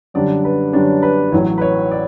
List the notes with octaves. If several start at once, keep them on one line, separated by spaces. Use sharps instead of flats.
F#2 D3 G3 D4 D5
B4
F#2 D3 G3 D4 C#5
B4
A1 A2 F#3 C#5
B4
C#5
D5